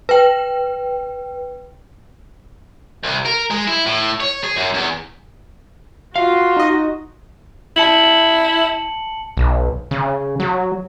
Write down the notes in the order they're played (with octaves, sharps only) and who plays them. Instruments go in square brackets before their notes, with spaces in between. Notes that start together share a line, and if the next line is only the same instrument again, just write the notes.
[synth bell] B4 G5
[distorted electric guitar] C2
A#4
G#3
E4
A2
C#5
G#4
F#2
E2
[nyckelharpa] F4 [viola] F#4 [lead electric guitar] F5
[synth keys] D#4 D#5
[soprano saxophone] E4 [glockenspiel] A5 C#7 F#7
[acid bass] B1
C#3
F#3